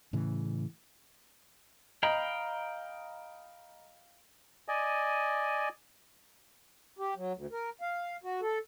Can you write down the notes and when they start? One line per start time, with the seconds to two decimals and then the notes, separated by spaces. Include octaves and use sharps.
0.13 A2 C#3 E3
2.03 D#5 F5 G5 A#5 B5
4.68 D5 D#5 G#5
6.98 G4
7.16 F#3
7.33 D2
7.52 A#4
7.81 F5
8.24 F#4
8.42 A4